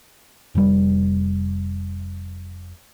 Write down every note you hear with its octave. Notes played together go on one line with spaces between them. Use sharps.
F1 G3